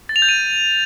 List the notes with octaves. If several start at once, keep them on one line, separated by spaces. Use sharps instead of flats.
A6
F7
G6
D#7